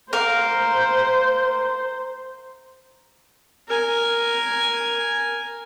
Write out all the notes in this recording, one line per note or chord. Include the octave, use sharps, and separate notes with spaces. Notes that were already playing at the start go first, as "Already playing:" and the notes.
A#4 C5 F5
A#4 G#5